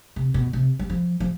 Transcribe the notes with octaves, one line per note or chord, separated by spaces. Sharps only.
C3
B2
C3
G3
F3
F3